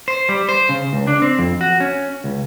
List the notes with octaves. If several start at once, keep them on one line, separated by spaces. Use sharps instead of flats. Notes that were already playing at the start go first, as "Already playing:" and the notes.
C5
G3
C5
C#3
C#2
D4
C4
F2
F#4
C#4
C#2